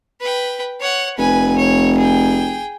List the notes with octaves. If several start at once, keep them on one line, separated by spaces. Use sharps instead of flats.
B4 G5
C#5 F#5
F1 B4 G#5
C#5
G#4 G5